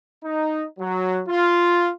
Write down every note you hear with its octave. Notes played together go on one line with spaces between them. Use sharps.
D#4
F#3
F4